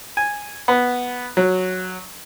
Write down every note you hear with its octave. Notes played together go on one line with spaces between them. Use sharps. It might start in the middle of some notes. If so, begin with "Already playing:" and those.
G#5
B3
F#3